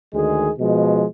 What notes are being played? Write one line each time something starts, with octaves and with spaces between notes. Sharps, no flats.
D2 D#3 G#3 G#4
B2 F3 G#3